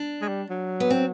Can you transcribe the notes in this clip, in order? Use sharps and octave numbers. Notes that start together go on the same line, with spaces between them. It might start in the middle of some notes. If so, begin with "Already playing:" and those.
Already playing: D4
G#3
G3
F#3
B3
C4